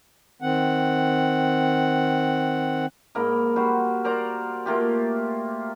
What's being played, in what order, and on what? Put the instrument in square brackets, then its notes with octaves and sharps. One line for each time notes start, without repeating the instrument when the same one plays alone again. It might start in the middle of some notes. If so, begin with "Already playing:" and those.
[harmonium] D#3 C4 F#5
[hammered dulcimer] G#2 A#3 A#4 B5
G3 F#4 C5
A#4 C5 D5 A#5
A3 A#3 F4 G4